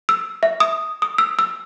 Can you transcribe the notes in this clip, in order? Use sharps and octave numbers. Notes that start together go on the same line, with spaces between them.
E6
E5
D#6
D#6
E6
E6